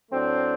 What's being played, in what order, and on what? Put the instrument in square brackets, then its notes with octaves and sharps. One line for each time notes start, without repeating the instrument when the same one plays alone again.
[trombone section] A2 F#3 A3 C4 D4